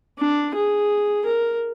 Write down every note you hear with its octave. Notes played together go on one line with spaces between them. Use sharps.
D4
G#4
A#4